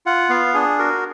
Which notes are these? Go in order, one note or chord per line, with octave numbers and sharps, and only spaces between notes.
F4 F#5
B3 F5
D4 G#4
F#4 A#4